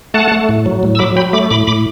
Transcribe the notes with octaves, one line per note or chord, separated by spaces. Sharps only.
A3 F#5 A5
A3
A2
F#3
A2
E6
F#3 B5 D6
F#3 G5 B5
A3 B5 D6
A2 B5 D6
A2 B5 D6